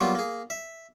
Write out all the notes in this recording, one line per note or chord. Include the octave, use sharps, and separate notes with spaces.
F#3 G3 A#3 B3 F4
A#3 G#4
E5